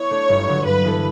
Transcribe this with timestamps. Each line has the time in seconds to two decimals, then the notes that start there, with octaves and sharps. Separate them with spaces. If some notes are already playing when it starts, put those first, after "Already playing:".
Already playing: B3 E4 C#5
0.10 A3 D4
0.29 G1
0.47 G2 D3 F#3
0.65 G2 B4
0.83 E3 B3 E4 A4